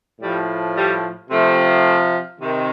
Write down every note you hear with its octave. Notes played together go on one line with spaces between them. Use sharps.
A2 F3 G3
G3
C3 F3 A3
C3 D#3